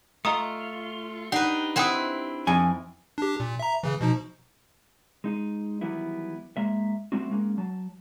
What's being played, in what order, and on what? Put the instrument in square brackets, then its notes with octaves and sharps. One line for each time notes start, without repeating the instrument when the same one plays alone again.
[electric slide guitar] A3 F4 [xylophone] D#5 A#5 D#6
[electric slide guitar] D4 G4 [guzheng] D#4 B4 [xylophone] F#5
[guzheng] C4 E4 B4 [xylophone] F#5 G5 D#6
[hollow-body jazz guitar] F2 G#5
[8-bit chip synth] D4 G4
A#2
E5 A#5
C#3 E3
B2 F3 D#4
[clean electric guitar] G#3 D#4
D#3 E3 F#3 G3 B3 E4
G#3 A#3 E5
G3 A3 C4 D4 F4 F#4
G#3 A#3 C#4
F#3 A5